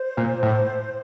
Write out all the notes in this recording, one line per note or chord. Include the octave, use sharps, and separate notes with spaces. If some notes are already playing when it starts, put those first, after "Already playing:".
Already playing: C5
A#2
A2